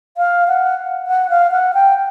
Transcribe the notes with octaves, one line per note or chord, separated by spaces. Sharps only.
F5
F#5
F#5
F5
F#5
G5